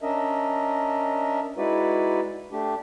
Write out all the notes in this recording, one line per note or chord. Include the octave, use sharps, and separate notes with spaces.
C#4 D4 A#4 D#5 E5
G#3 D#4 E4 F#4 B4 D5
A3 D4 G4